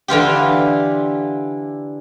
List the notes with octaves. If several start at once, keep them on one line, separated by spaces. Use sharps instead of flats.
D3 E3 F4 G4